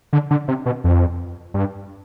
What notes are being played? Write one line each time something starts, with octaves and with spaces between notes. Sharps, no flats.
D3
D3
C3
B2
F2
G2